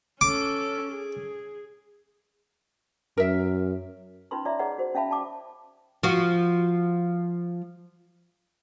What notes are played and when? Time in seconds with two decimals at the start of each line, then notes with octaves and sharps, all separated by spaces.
0.21 C#4 A4 D6
0.92 G#4
3.17 F#2 A#4 E5
4.31 C#4 D#4 F4 B4 B5 C6
4.45 F4 C#5 D5 E5 A#5 D6
4.59 G#4 B4 C#5 D#5 F#5 A#5
4.78 F#4 C5
4.95 C#4 E5 F5 A5 B5
5.09 D5 A5 D6
6.03 F3 F#4